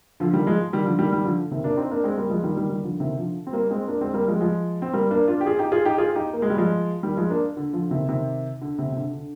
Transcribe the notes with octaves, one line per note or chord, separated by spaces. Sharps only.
D3 F3
D#3 G3
F3 G#3
D#3 G3
D3 F3
D#3 G3
D#3 G3
D3 F3
C3 D#3
A#3 D4
C4 D#4
A#3 D4
G#3 C4
G3 A#3
F3 G#3
D#3 G3
D#3 G3
D#3 G3
D3 F3
C3 D#3
D3 F3
C4
G3 A#3
G#3 C4
A#3 D4
G#3 C4
G3 A#3
F3 G#3
G3
F3 G#3
C4
G3 A#3
A#3 D4
D4 F4
G4
F4 G#4
D#4 G4
F4 G#4
D#4 G4
F4 G#4
D#4 G4
A#3
G#3
G3
F3 G#3
D#3 G3
F3 G#3
A#3 D4
D3
D3 F3
C3 D#3
C3 D#3
D3
C3
C3
D3
D3